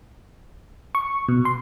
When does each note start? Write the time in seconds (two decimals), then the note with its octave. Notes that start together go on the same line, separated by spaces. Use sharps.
0.95 C#6
1.29 B2
1.45 C6